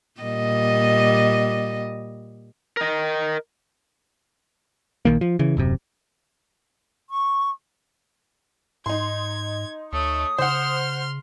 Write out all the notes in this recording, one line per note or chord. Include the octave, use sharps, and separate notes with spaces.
A#2 G3 D#5
A#4 D#5
A#1 D#3 A#3
F3
C#3 E3
D#1 F#2 C3
C#6
G#2 D#4 C6 G#6
D2 A3 C#5 D#6
C#3 C5 F#5 C6 F6